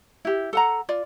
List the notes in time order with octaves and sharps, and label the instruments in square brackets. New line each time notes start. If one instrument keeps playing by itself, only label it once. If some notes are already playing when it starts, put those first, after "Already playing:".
[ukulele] E4 G4
A4 F#5 A#5
F4 D5